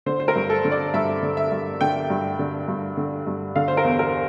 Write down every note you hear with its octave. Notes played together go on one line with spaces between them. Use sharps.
D3 C5
C5
A#4
G2
A4
D3
D5
G2 E5
D3
E5
G2
D3 G5
G2
D3
G2
D3
G2
D3 F5
C5
A#4
E2
A#4